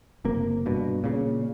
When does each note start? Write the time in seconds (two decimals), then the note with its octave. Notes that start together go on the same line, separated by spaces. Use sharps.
0.25 F#1 C3 A#3
0.66 G2 B2
1.04 A#2 C#3